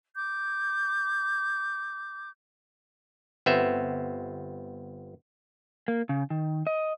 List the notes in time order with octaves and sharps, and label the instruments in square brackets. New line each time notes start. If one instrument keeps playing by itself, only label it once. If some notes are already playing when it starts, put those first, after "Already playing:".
[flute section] D6 G6
[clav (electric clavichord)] G1 B3 C4 E5
[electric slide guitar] A#3
C#3
D#3
D#5